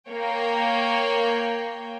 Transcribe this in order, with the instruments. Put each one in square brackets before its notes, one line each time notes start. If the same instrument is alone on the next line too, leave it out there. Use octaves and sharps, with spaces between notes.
[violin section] A#3 C#5 G5